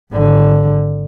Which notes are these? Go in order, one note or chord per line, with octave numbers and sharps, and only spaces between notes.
G#1 D3